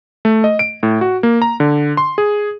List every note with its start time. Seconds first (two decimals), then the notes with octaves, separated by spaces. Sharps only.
0.25 A3
0.44 D#5
0.59 D7
0.83 A2
1.01 F#4
1.23 A#3
1.42 A#5
1.60 D3
1.97 C6
2.18 G#4